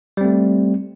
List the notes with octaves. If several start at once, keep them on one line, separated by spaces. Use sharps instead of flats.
G3 A3 C4